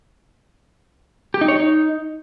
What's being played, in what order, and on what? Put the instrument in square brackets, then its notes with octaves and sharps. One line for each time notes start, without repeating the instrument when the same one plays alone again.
[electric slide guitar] G4
D#4
C#5
D#4